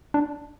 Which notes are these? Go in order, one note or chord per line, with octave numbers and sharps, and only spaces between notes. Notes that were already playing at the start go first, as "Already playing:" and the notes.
D4